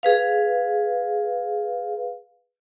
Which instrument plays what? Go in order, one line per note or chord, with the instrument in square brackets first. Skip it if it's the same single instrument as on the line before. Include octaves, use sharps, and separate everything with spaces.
[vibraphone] G#4 B4 F5